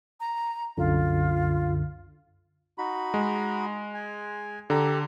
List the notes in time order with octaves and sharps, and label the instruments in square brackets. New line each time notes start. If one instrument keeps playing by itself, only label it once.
[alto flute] A#5
[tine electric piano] C2 F#2 D3 [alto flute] F4
[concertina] D#4 F#4 B5
[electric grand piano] G#3
[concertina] G#5
[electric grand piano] D3 A#5 [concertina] G4 A4